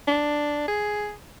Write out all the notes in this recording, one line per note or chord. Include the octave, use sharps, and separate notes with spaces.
D4
G#4